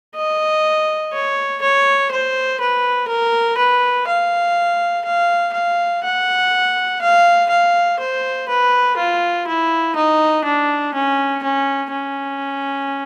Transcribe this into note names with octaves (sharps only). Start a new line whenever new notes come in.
D#5
C#5
C#5
C5
B4
A#4
B4
F5
F5
F5
F#5
F5
F5
C5
B4
F4
E4
D#4
D4
C#4
C#4
C#4